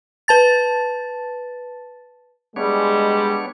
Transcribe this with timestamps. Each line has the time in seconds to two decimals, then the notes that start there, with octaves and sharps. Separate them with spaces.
0.28 B4 A5 A6
2.56 G3 G#3 B3 D4 C#5